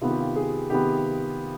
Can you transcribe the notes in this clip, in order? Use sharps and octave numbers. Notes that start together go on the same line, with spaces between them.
C3 D#3 B3 F4
G4
F4
G#4
C3 D#3 B3 G4